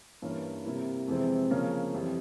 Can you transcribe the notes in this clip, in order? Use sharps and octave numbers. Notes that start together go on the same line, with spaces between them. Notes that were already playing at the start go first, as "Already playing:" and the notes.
G2 E3 A#3 C#4
C3 G3 A#3 E4
F2 C3 E3 G#3 C4
C#3 F3 A#3 C#4
F2 E3 G3